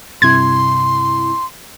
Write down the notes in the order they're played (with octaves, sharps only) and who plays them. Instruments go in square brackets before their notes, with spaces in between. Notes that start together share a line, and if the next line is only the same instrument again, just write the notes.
[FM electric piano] G2 C3 E4 [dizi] C6 [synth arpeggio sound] G#6